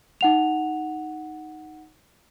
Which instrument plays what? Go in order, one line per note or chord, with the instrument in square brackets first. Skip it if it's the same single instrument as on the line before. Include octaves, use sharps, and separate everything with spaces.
[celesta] D#4 F#5 F7